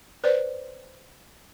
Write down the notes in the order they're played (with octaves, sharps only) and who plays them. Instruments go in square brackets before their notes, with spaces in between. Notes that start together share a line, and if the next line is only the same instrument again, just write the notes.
[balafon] B4 C5 D5